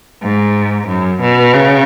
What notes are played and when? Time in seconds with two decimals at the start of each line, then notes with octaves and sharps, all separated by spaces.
0.22 G#2
0.88 F#2
1.21 B2
1.54 C#3